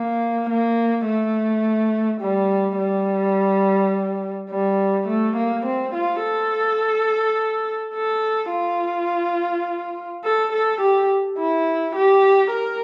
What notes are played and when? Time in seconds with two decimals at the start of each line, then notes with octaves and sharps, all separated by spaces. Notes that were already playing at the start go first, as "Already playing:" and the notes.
Already playing: A#3
0.49 A#3
1.06 A3
2.21 G3
2.78 G3
4.50 G3
5.07 A3
5.36 A#3
5.65 C4
5.94 F4
6.23 A4
7.94 A4
8.52 F4
10.24 A4
10.52 A4
10.81 G4
11.38 E4
11.96 G4
12.53 A#4